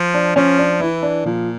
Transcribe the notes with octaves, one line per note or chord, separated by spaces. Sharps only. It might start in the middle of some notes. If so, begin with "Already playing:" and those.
Already playing: F3
D4
F3 C#4
D4
E3 E4
D4
A#2 F3